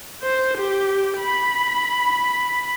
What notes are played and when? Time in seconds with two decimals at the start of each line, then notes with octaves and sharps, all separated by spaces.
0.23 C5
0.58 G4
1.19 B5